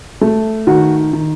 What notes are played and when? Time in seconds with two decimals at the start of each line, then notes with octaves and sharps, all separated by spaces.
0.21 A3
0.67 D#3 F#4
1.13 D#3